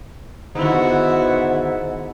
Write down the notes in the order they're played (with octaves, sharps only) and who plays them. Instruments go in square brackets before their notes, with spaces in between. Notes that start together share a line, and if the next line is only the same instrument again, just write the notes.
[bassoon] G#2 [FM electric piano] D3 D#3 [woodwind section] B3 [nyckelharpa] E4 F#4